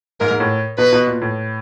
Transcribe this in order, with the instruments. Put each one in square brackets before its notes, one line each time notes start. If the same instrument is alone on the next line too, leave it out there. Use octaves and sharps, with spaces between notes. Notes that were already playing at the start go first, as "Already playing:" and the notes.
[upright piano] G#2 [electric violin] A#4
[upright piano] G#2
A2
[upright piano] B2 [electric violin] B4
[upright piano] B2
A#2
A2